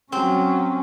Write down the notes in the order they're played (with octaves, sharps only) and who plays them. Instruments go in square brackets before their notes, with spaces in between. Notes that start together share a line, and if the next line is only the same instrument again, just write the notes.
[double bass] F#3 C#4 [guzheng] C4